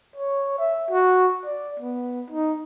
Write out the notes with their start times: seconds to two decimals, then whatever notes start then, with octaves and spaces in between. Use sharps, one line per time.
0.16 C#5
0.59 E5
0.90 F#4
1.45 D5
1.79 B3
2.30 D#4